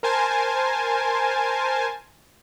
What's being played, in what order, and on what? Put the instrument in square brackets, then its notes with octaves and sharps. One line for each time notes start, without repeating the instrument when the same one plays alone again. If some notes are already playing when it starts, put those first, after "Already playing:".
[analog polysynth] A#4 C5 G#5 A5